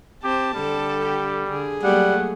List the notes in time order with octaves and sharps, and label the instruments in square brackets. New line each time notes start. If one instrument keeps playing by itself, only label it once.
[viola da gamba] C4 C5 [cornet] G4 [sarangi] A5
[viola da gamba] D3 A4 [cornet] G3
[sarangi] G4
[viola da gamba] D3 [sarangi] G#4
[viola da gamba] F#3 A3 A#3 [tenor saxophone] G3 [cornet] F#5